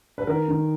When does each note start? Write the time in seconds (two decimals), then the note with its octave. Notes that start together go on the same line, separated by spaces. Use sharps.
0.18 B4
0.27 D#3 A#4
0.48 D#3